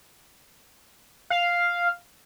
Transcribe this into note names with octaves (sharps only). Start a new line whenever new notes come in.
F5